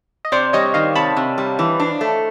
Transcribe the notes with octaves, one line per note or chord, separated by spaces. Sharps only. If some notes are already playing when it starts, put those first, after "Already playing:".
D#5
C3 C5 D5
G3 C#5 D#5
D#3 D#5 F5
C3 A5 B5
C3
G3
E3
D4
A3